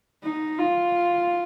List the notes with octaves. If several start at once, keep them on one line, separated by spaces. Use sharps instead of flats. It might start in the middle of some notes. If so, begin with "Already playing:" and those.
D#4
F4